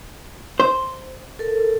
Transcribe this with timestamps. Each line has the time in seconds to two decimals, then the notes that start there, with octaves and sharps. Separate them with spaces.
0.60 C5
1.39 A4 A#4